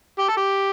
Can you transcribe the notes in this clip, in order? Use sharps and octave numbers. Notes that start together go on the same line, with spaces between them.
G4
A4
G4